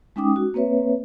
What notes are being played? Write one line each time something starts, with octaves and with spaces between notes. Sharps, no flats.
G#3 C#4 D#4 G5 D6 D#6
F#4
A#3 C4 B4 C#5 E5